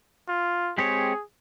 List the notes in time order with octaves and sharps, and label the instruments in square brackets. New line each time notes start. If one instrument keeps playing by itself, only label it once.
[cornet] F4
[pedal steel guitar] G#3 C4 G4 C#5 [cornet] G#4